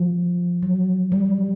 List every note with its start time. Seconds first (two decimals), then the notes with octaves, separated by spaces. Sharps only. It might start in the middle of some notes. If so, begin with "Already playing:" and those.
Already playing: F3
0.63 F#3
1.12 G3